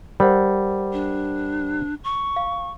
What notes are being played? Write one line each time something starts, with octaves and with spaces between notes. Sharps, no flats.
G3 A#4 C5 F#5
D4
C#6
F5